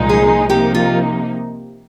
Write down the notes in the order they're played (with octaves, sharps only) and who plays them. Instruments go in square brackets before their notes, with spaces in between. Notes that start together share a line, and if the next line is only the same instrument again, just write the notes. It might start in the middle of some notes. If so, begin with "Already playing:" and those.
Already playing: [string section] C2 A#2 F3 G#3 D#4
[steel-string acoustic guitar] G#4
[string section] C3 F3 A#3 D#4 [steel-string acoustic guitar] G4
[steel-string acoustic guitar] F4